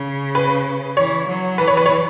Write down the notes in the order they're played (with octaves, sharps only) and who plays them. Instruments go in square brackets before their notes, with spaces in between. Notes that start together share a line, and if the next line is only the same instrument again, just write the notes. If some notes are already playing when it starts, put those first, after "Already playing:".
Already playing: [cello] C#3
[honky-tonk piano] B4
[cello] E3 [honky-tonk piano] C#5
[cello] F#3
[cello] E3 [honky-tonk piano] B4
[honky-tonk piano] C#5
B4
C#5